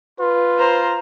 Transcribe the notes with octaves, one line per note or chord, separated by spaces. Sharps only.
F4 B4
C5 A#5